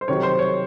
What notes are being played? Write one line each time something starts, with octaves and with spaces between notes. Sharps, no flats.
C5
C3 D#3 F#3 C#5
C5
C#5